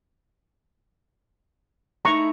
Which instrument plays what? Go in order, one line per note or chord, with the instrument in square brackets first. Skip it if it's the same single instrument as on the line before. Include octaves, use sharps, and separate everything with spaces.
[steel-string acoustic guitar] A3 D#4 E4 [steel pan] A#5 C#6